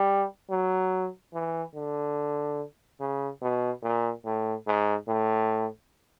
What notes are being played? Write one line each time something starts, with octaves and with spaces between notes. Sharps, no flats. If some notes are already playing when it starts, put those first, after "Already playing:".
Already playing: G3
F#3
E3
D3
C#3
B2
A#2
A2
G#2
A2